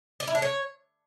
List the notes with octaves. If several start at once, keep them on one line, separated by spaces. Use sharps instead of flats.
D5
E4
D4
C#5